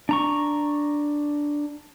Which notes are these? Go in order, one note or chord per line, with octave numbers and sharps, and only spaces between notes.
D4 A#5 C#6